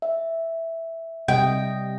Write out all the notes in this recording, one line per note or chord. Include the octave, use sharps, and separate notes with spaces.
E5
C3 G3 D#5 G5